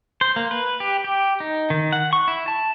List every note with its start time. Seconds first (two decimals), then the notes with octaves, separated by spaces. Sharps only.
0.21 C5
0.36 A#3
0.51 B4
0.80 G4
1.04 G4
1.40 D#4
1.70 D#3
1.92 F#5
2.13 C#6
2.28 E4
2.48 A5